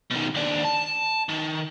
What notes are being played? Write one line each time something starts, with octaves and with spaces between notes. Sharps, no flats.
B2 D#3
D#2 D4
A5
D#3